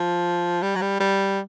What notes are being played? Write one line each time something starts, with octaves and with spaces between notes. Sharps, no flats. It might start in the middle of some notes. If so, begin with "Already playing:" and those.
Already playing: F3
G3
F#3
G3
G3